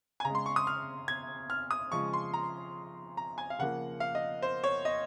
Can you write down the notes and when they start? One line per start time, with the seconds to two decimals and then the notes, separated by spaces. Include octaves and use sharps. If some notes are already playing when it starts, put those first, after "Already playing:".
0.20 G#5
0.25 C#3 A#5
0.30 G#3
0.35 C6
0.46 C#6
0.56 D#6
0.67 F6
1.08 G#6
1.50 F6
1.71 D#6
1.92 C#3 F3 G#3 C#6
2.13 C6
2.34 A#5
3.17 A#5
3.38 G#5
3.50 F5
3.59 C#3 F3 A#3 F#5
4.00 F5
4.15 D#5
4.42 C5
4.64 C#5
4.85 D#5